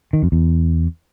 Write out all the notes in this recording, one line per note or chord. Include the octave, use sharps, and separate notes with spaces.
D#3
F2
E2